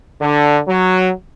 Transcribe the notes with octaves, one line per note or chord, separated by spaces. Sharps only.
D3
F#3